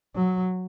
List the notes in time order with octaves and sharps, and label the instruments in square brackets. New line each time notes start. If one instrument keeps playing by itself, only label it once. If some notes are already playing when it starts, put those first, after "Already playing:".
[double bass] F#3